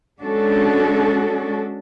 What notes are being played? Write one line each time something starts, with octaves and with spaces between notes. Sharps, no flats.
G#3 C#4 D4 F#4 A4